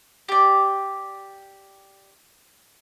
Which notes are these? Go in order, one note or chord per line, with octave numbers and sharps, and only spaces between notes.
G4 D5